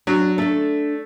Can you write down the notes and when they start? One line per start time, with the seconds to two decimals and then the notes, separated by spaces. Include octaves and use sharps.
0.07 F#3 D4
0.38 A3 D4 A4